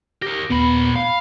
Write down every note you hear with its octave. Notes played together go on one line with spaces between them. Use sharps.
G4 A#4 A#6
D#2 A#2 B3 B5
F5 B5